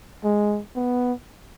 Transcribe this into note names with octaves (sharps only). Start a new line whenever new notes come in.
G#3
B3